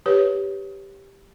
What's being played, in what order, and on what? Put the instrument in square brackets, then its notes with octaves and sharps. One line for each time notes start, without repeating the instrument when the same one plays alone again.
[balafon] G4 B4 C#5